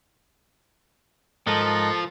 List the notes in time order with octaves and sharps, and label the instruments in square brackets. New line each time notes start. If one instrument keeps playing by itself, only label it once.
[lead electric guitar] G#2 [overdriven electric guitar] F3 [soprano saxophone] A4 [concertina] A#4 D#5 F#6